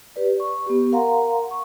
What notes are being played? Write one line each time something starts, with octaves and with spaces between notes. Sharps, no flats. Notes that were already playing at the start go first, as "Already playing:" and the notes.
G4 B4 D5
C#6
B3 G4
A#4 F5 F#5 A#5 C6
C#6